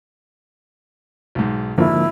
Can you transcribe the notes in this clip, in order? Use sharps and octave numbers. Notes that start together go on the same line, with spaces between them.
B1 G#2
G#1 D3 F3 A#3 E4